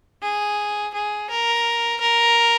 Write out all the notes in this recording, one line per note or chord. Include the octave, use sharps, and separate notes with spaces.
G#4
G#4
A#4
A#4